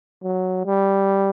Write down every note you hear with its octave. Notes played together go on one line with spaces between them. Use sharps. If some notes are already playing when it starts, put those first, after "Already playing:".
F#3
G3